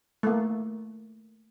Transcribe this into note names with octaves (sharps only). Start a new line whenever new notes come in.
A3 A#3